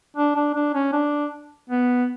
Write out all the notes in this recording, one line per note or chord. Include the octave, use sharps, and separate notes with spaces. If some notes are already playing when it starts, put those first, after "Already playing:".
D4
D4
D4
C#4
D4
B3